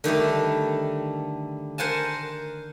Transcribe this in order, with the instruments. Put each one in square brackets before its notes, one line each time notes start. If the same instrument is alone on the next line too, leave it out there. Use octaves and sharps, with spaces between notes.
[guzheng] D3 D#3 G3 A3
A#4 C5 F#5 G#5 A5